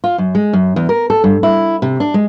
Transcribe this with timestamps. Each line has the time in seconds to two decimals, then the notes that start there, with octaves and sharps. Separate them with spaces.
0.04 F4
0.18 F#2
0.35 G#3
0.53 F#2
0.76 E2
0.89 A#4
1.10 A4
1.24 G2
1.43 E4
1.82 C3
2.00 D4
2.14 G#3